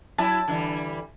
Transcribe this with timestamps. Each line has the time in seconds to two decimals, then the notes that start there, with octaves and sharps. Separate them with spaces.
0.18 F#3 E4 A5
0.48 D3 E3 G3